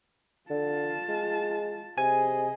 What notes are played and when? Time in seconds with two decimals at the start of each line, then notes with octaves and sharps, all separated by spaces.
0.50 D3 F4 A5
1.09 G#3
1.97 C3 G#4 D#5 G#5